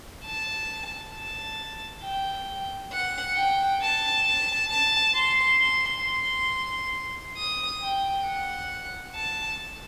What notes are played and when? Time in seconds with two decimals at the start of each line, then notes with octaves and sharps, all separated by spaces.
0.25 A5
1.14 A5
2.03 G5
2.92 F#5
3.36 G5
3.81 A5
4.26 A5
4.70 A5
5.14 C6
5.59 C6
6.04 C6
7.37 D#6
7.82 G5
8.26 F#5
9.15 A5